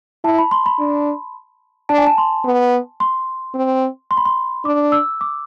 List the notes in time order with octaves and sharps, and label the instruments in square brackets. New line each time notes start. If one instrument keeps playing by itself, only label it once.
[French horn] E4 [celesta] A5
[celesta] B5
C6
B5
[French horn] D4
[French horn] D4 [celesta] A5
[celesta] G#5
A5
C6
[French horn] B3
[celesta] C6
[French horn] C4
[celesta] C6
B5
C6
[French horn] D4 [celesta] D6
[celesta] E6
D6